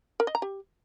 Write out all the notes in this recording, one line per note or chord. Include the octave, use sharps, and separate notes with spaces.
A#4
D#5
A#5
G4